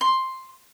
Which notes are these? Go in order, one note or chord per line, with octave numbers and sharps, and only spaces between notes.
C6